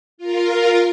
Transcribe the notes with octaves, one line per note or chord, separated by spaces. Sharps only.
F4 A#4